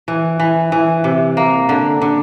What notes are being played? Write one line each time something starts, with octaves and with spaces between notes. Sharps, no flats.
E3
E3
E3
C3
A#3
D3
D3